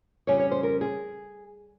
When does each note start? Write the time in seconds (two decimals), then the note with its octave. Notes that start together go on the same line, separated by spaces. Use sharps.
0.27 F2 C#3 G3 C#4 C#5
0.39 C#5
0.51 C5
0.63 A#4
0.81 G#4